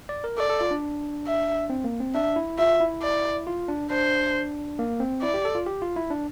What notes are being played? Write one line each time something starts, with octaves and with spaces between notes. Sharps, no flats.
D5
A#4
A4 D5
A4
F4
D4
E5
C4
A#3
C4
D4 E5
E4
F4 E5
E4
D5
F4
D4
D4 C5
A#3
C4
E4 D5
G4
A4
F4
G4
F4
E4
D4